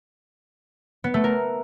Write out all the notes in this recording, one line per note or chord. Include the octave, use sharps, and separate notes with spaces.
B3
A3
A#4